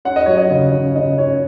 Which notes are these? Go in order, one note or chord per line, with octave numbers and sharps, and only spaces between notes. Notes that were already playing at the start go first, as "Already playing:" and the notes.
C#4 F#5
D#5
F#3 C#5
D#5
C#3
C#3
C#3 D#5
C#4 C#5